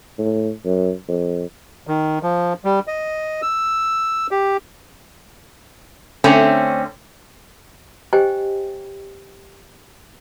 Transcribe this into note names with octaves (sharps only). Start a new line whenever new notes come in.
A2
F#2
F2
D#3
F3
G3
D#5
E6
G4
D3 A3 C4 C#4
G4 C5 D#5 G5 G#5